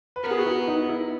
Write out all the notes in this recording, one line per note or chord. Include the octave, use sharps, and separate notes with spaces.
B4
B3 A#4
G#4
F#4
E4
D#4
E4